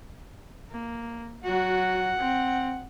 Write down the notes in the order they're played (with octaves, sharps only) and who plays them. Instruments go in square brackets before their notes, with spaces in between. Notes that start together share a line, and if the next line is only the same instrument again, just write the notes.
[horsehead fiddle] A#3
[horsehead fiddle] F#3 F#4 [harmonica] F#5
[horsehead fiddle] C4